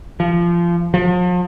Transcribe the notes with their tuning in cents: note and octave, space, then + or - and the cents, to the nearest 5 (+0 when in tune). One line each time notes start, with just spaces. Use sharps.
F3 -20
F3 +40